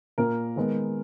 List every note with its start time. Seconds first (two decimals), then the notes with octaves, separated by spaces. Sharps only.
0.18 A#2 A#3 A#4
0.56 D#3 G#3 B3